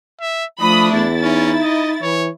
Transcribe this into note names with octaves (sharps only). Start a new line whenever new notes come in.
E5
F3 A3 D4 B5 D#6
E2 E4 A6
C#4 D#4
D#5
E3 C#5